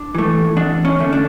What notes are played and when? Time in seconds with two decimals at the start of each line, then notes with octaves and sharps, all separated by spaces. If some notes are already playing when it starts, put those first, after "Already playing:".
Already playing: D4
0.15 E3 A3
0.57 E2 D4
0.85 C#4
0.99 D3 A3
1.13 D4